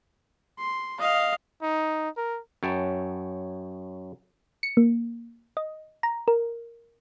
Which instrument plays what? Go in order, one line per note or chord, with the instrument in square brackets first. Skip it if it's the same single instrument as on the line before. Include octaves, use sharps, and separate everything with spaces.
[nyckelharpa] C6
D#5 F5
[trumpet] D#4
A#4
[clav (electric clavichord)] F#2 C#5 G5 A5
[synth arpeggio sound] C#7
A#3
D#5
A#5
A#4